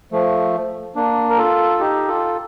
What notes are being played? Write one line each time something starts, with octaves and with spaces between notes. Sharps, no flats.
F3 A3
A#3 D4
A#4
F4 A4
D#4 G4
F4 A4